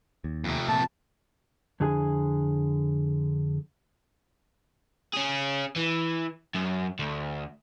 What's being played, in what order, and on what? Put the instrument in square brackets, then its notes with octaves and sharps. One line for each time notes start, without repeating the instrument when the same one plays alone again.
[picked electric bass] D#2
[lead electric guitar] F2 C3
[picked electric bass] A#2 [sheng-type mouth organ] A5
[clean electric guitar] F2 D3 E4 G#4 G#5
[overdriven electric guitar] C#4 G#4
E3
F#2
D2